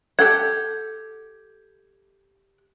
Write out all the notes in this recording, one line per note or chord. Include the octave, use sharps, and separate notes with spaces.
G4 A4 F#5 G#6